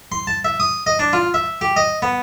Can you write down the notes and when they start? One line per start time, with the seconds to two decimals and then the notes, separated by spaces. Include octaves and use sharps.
0.12 C6
0.27 A5
0.45 E5
0.60 D#6
0.87 D#5
0.99 D4
1.13 F4
1.34 E5
1.61 G4
1.76 D#5
2.02 B3